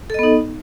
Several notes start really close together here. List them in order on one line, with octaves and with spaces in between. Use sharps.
A4 D#5 B3 D#4